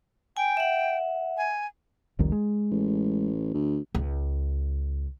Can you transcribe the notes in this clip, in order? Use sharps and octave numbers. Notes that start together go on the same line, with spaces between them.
G5 G#5
E5 F#5
G#5
F1 C2 D#3
G#3
A1
D2
C#2